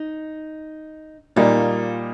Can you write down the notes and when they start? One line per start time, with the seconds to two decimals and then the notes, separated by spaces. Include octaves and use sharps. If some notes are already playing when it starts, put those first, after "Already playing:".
Already playing: D#4
1.36 A#2 G3 A#3 D#4 F4